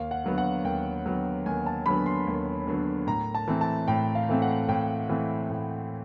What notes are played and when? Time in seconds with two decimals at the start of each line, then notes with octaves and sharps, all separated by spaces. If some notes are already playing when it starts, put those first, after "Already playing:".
Already playing: D#2 F5
0.11 F#5
0.24 D3 F#3 B3
0.38 F#5
0.64 D#2 G5
1.05 D3 F#3 B3
1.46 D#2 G#5
1.66 A5
1.86 D3 F#3 B3 B5
2.06 C6
2.27 D#2
2.67 D3 F#3 B3
3.07 A2 A#5
3.35 A5
3.48 E3 A3 C4
3.61 A5
3.88 A2 G5
4.15 F5
4.29 E3 A3 C4
4.42 F#5
4.68 A2 G5
5.09 E3 A3 C4
5.50 A2